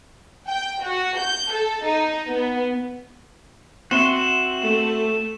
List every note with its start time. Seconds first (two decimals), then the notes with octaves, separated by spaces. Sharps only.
0.46 G5
0.81 F#4
1.16 G6
1.51 A4
1.84 D#4
2.28 B3
3.91 C4 F#4 E5 C6 E7
4.61 A3 A4